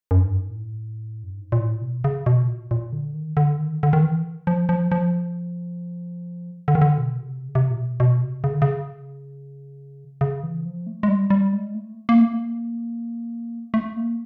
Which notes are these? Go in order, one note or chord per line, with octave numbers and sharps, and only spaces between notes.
F#2
G2
G#2
A2
F#2
G2
G#2
A#2
A2
B2
C#3
B2
A#2
A#2
D3
D#3
D3
D#3
D3
D#3
E3
F3
F3
F3
D3
D#3
D3
B2
C#3
C3
C#3
C3
A#2
B2
B2
C3
C#3
D3
C#3
C#3
E3
F3
A3
G#3
G3
G3
G#3
A3
A#3
A3
A#3
A3
A#3